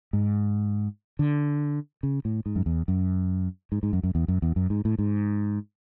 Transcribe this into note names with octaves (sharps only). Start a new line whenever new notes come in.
G#2
D3
C#3
A2
G#2
F#2
E2
F#2
G#2
G#2
F#2
F#2
E2
F#2
E2
F#2
G#2
A2
G#2